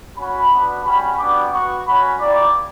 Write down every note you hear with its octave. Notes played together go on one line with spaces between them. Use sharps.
C#4 F#4 B5
B3 D4 F#4
G3 C#4 F#4 B5
G3 B3 D4 F#4 D6
B3 F#4 C#6
C#4 F#4 B5
A#3 E4 G4 D5